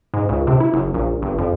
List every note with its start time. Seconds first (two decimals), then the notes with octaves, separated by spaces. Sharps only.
0.14 G#2
0.29 C#2
0.47 C3
0.60 E4
0.74 F#1
0.94 A#1
1.22 G1
1.38 F2